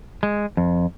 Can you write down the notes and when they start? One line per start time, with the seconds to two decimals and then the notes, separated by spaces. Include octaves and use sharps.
0.23 G#3
0.57 F2